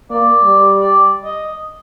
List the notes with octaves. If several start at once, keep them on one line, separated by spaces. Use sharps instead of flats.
A#3 D5
G3
D5
D#5